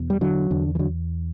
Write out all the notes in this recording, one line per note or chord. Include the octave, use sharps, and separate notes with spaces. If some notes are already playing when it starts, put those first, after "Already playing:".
Already playing: E2 B2
G3
D3 F#3
E2 D3
E3
D3 F#3